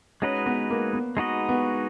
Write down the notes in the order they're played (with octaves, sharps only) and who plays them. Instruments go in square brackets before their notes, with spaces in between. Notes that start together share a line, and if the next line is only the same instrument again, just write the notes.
[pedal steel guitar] G#3 D#4 F#4 B4 D#5 [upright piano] C#4
[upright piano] B3
A#3
B3
[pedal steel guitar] G#3 D#4 F#4 B4 D#5
[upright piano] B3